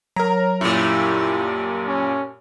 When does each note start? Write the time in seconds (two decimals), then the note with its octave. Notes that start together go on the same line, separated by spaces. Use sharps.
0.16 F#3 A#4 A#5
0.61 F#2 A#2 G3 A3 E4
1.87 C#4